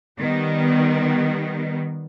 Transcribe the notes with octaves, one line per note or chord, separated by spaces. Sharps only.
D#3 G3 B3